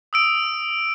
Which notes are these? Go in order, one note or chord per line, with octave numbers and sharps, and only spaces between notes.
D#6 E6 D7